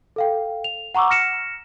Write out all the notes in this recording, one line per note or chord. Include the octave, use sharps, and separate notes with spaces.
A4 F5 G5
F7
F#5 A#5 C#6 D6 E6
F6 A#6 C#7 E7